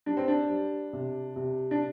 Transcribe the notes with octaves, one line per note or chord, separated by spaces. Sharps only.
G3 D4
C4
D4
G3
C3
C3
D4